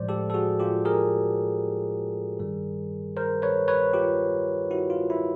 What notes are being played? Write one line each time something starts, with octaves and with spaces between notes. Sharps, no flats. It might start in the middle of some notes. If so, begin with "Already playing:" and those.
Already playing: A2 F3 G#3 C5 D5
G4 A4
A4
F#4 G#4
F4 G4
G#4 A#4
G2 D#3 G3
A#4 C5
B4 C#5
B4 C#5
F4 G4
E4 F#4
F4
E4